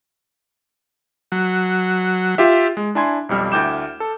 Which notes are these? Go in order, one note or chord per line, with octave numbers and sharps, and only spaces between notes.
F#3
F4 G4 E5
G#3
D4 E4 G#5 C6 G#6
B1 F2 G3 F6
D2 E4 G5 D6 G6 E7
A4